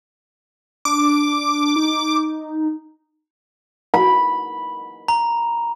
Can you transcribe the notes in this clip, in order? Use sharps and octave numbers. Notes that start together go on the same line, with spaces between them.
D4 D6
D#4
B5
A#5